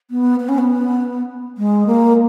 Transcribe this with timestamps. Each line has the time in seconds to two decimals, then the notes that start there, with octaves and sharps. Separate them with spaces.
0.10 B3
0.39 B3
0.48 C#4
0.58 B3
1.57 G#3
1.86 A#3